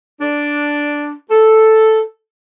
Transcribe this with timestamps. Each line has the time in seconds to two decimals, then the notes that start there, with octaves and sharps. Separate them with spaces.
0.21 D4
1.31 A4